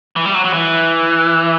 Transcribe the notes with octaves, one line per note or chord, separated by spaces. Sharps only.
E3
G3
F#3
F#3
E3